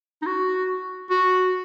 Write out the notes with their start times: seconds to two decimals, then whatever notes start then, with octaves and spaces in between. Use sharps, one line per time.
0.22 D#4
0.26 F#4
1.10 F#4